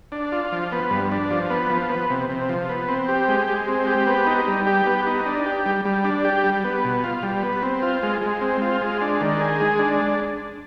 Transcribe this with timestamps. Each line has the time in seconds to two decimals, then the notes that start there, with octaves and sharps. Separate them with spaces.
0.12 D4
0.32 F4
0.52 F3
0.72 B3
0.91 G2
1.12 D4
1.31 F3
1.50 B3
1.70 F3
1.90 B3
2.10 C3
2.29 C3
2.49 F3
2.69 B3
2.88 C4
3.08 G4
3.28 G#3
3.48 G#3
3.68 C4
3.87 G4
4.07 B3
4.27 D#4
4.47 G3
4.67 G4
4.86 B3
5.07 D#4
5.26 D4
5.46 G4
5.66 G3
5.85 G3
6.05 D4
6.25 G4
6.44 G3
6.64 B3
6.84 B2
7.04 F4
7.23 G3
7.43 B3
7.63 C4
7.82 F4
8.03 G#3
8.21 G#3
8.41 C4
8.62 F4
8.81 G#3
9.01 D4
9.21 D#3
9.40 G#4
9.60 G#3
9.79 D4